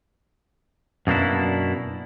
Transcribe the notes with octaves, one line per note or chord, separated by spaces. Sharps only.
F#2 B2 A#3 D4 E4